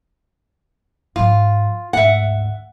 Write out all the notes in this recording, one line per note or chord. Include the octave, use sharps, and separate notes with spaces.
G#2 F3 F4
D2 G#2 E5 F#5